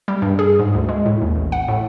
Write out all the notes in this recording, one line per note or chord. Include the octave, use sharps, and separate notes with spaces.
G3
G2
G#4
G#2
D2
G#3
A2
D#2
A1
F#5
A2